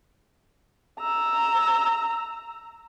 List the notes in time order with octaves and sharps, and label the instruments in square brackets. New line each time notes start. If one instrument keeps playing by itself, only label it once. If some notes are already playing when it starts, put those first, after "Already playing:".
[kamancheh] A#5 E6